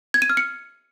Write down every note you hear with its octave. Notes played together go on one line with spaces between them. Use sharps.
G#6
D#7
F6
C#7